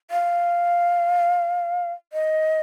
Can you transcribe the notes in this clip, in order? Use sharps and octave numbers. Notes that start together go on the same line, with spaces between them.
F5
D#5